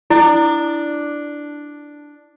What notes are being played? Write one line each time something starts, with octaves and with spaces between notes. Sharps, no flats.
D4 E4